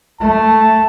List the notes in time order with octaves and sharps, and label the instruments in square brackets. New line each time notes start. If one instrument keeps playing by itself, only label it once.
[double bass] A3 [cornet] A5